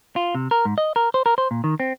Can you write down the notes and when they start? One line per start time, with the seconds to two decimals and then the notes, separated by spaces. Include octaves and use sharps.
0.16 F4
0.35 C3
0.51 A#4
0.65 G#2
0.78 D#5
0.96 A#4
1.14 C5
1.26 A#4
1.38 C5
1.51 A#2
1.64 D#3
1.80 C4